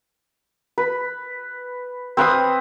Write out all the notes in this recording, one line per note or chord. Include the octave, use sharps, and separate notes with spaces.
B4
C4 B4 F5 D#6